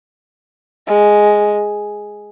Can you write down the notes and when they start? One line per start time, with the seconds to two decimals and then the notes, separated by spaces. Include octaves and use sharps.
0.87 G#3